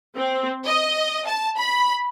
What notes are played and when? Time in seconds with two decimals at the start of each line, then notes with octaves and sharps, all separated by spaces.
0.16 C4
0.66 D#5
1.27 A5
1.58 B5